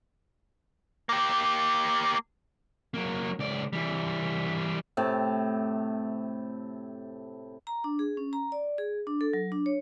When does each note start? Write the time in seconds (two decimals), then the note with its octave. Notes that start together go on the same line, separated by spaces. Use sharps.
1.09 A#3 G4
2.94 F#3 A#3
3.39 C#2 D5
3.73 E3 G3
4.97 A2 C3 A5
7.67 A#5
7.84 D4
7.99 G#4
8.17 C#4
8.33 A#5
8.52 D5
8.78 G#4
9.07 D4
9.21 A4
9.33 F#3
9.52 D4
9.66 C#5